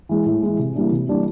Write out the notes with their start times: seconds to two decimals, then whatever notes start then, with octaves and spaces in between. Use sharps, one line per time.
0.09 E3 G#3
0.26 A2
0.43 E3 G#3
0.59 C3
0.75 E3 G3 A#3 D4
0.92 C3
1.08 E3 G3 A#3 D4